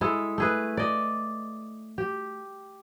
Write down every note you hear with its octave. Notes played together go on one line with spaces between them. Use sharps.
G#3 E4 A4
A3 G#4 B4
D5 D#5
G4